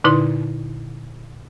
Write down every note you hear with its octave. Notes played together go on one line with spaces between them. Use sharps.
A#2 D3 D#4 E4 B4 C6